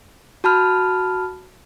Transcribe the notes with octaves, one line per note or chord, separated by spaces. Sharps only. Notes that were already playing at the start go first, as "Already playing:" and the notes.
F#4 A5 B5 F6